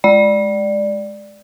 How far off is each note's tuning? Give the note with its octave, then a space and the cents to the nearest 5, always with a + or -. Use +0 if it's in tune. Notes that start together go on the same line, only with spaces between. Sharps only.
G#3 +10 D5 +5